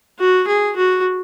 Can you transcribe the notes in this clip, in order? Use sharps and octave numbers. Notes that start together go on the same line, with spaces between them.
F#4
G#4
F#4